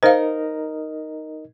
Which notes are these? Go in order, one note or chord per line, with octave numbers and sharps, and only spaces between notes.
D#4 A#4 C5 D#5 F5